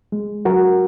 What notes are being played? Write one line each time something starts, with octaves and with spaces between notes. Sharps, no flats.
G#3
F#3 F#4 A#4